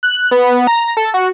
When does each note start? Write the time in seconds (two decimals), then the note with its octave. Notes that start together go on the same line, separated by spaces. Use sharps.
0.03 F#6
0.31 B3
0.51 B3
0.67 A#5
0.97 A4
1.14 F#4